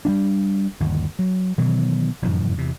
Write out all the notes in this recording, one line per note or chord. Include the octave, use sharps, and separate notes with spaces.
G3 A#3 D4
G1 D#2
F#3
B2 D#3 E3 F#3
F1 F#2 A2 E3
E2 C3